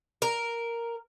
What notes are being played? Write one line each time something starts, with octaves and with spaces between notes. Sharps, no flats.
A#4